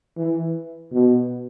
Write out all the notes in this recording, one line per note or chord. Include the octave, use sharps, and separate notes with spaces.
E3
B2